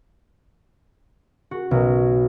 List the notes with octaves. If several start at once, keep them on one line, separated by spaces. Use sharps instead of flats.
F#4
B1